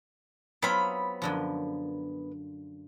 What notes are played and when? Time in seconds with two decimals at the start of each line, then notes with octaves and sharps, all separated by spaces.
0.63 F#3 B3 C4 F4 B5
1.22 F#2 D3 F3